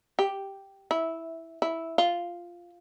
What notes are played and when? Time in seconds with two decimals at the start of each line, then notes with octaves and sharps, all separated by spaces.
0.19 G4
0.91 E4
1.62 E4
1.98 F4